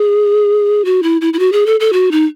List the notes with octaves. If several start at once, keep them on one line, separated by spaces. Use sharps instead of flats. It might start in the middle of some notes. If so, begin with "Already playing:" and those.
Already playing: G#4
F#4
E4
E4
E4
F#4
G#4
A4
A4
F#4
D#4